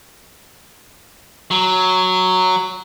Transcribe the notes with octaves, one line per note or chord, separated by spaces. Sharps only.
F#3